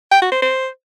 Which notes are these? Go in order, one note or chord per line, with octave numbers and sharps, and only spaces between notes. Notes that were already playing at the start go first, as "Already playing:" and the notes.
G5
F#4
C5
C5